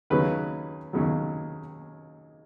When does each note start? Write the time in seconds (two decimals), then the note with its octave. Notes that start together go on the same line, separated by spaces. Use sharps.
0.10 D#2 C#3 F#3 B4
0.93 D#2 C#3 F#3